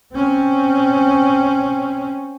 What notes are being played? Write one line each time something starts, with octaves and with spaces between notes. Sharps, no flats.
C4 C#4